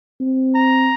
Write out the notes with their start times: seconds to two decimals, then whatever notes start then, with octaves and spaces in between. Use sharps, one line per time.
0.21 C4
0.55 A#5